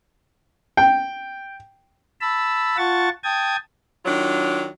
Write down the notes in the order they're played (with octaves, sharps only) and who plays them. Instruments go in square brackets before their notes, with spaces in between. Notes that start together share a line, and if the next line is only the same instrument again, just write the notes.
[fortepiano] G5
[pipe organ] A5 B5 E6
F4 F#5 A5 C#6 A6
G5 A5 D#6 G#6
[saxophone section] D#3 F#3 D4 F4